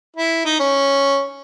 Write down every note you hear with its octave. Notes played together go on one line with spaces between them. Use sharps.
E4
D#4
C#4